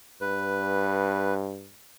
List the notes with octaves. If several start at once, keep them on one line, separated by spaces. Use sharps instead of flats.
G2 B4